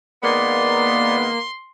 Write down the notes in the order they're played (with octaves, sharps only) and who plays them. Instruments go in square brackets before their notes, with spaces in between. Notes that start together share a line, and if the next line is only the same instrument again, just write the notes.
[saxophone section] D#3 G#3 B3 [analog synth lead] A#3 [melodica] D5 [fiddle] C6